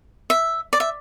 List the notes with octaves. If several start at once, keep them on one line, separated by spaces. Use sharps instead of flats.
E5
D5
E5